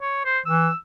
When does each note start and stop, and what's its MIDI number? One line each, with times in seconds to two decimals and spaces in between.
0.01 0.21 73
0.25 0.39 72
0.46 0.70 52
0.46 0.76 88